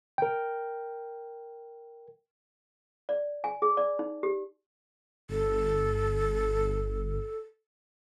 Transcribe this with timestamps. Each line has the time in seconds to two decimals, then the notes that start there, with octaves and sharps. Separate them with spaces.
0.18 A#4 G5
3.09 D5
3.44 G#5
3.62 G#4
3.77 D5
3.99 D#4
4.23 G4
5.29 G1 A4